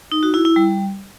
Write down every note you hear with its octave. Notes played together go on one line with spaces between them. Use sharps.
D#4
F#4
E4
E4
G3